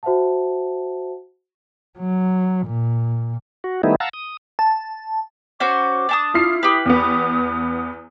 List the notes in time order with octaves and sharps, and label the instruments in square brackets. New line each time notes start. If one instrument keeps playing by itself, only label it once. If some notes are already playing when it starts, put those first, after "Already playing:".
[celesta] F#4 C5 E5 F#5 A5
[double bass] F#3
A#2
[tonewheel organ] F#4
D#3 G3 A3 B3 D#4 E4
F5 F#5 A5 A#5 E6
D#6
[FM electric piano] A5
[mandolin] C#4 F#4 C5 [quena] D6
[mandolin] D4 A5 D#6
[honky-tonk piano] E4 F6 C7 [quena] F4
[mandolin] G4 B4 [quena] D#6
[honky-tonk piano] E2 B3 [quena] D#6